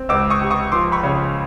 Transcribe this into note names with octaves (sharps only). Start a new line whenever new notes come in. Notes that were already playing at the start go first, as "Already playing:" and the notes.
Already playing: C4
C#2 D6 E6
C#6 D#6
C3
C#6 D#6
F3 C6 D6
B5 C#6
C#3